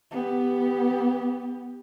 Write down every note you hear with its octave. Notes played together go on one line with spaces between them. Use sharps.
B3 G4